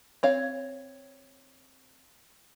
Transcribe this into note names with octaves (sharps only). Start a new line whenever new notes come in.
C4 C#5 F5